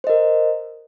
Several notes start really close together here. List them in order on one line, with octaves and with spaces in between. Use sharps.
C5 D#5 A#4